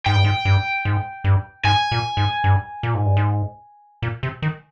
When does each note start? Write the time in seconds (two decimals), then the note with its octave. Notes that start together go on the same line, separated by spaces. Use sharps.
0.06 G#2 G5
0.15 G2
0.24 G#2
0.45 G2
0.85 G#2
1.24 G2
1.64 G#2 G#5
1.91 A#2
2.17 G#2
2.44 G2
2.83 A#2
2.94 G#2
3.06 G2
3.17 G#2
4.02 A#2
4.23 C3
4.42 D#3